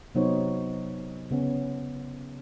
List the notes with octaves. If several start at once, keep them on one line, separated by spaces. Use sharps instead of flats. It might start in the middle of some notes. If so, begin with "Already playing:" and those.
C3 F#3 B3 D#4 C5 C#5
C#3 B3 C#4